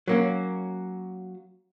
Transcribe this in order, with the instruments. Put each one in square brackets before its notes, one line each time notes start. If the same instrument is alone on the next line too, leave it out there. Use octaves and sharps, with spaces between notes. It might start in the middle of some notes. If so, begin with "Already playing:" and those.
[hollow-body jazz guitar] F#3 A#3 C#4